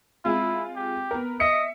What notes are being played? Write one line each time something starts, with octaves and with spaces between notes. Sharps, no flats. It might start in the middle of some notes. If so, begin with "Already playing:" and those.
G#3 C4 E4 F4
G4
B3 A#4
D#5 E5 C#7